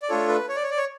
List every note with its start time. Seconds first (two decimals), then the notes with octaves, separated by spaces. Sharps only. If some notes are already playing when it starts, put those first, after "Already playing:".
0.02 D5
0.09 A3 D4 F4 A4 C#5
0.28 B4
0.49 C#5
0.56 D5
0.63 C#5
0.71 D5
0.77 C#5